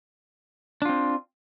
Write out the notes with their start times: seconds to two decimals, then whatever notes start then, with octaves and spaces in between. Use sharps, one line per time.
0.82 D4
0.85 F4
0.89 C4